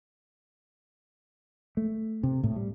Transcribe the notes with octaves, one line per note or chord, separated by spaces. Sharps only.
A3
C3
A2
G3